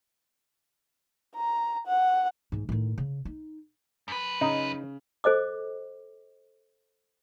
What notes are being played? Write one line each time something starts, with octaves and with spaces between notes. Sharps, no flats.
A#5
F#5
G#2 E3
A2 D#3
C#3
D#4
F#2 B4
C#3 D#4
A4 C5 D#5 D6